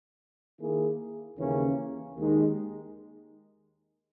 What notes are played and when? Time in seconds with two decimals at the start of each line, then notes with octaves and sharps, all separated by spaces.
0.58 D#3 A#3 E4 G#4
1.37 D#2 C#3 E3 A#3 C#4
2.14 D#2 D#3 G#3 D#4